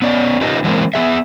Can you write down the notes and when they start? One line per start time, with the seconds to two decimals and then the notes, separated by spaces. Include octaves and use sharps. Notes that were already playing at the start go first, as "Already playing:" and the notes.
0.02 B3 C#4 D5
0.41 C#4 D#4 F4 G4 B4 D#5
0.64 E3 F#3 G#3 A#3 C4
0.94 B3 G#4 E5